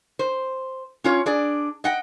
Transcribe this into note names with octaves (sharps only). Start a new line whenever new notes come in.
C5
C#4 F4 C#5
D4 G#4 D5
D#5 F#5 G5